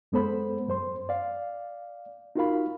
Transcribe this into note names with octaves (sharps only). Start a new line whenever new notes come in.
F#2 G#3 B3 A4 C5 B5
F#2 C5 C6
D5 F5
D#4 F4 F#4 A#4 F5 B5